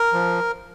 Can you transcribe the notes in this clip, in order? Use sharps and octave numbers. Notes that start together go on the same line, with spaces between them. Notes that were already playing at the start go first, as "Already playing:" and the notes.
Already playing: A#4
F3